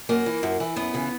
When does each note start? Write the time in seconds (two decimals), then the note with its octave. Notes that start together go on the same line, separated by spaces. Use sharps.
0.09 F#2 A#3
0.26 E3
0.43 F#2
0.60 E3
0.76 F#2 B3
0.94 C#3 E3